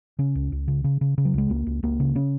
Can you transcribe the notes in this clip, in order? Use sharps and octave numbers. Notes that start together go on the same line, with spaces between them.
C#3 C#4
C#2
C#2
C#3
C#3
C#3
C#3
F#3
C#2 G#3
C#2 A#3
C#2
C#2 A#3
C#3
C#3 C#4